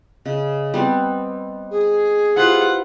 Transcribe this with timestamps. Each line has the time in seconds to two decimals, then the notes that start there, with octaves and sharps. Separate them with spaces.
0.25 C#3 D#5
0.74 G3 B3 C4
1.70 G#4
2.37 E4 F4 G4 B4 C5 F#5